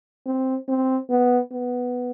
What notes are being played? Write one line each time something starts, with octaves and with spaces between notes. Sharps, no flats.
C4
C4
B3
B3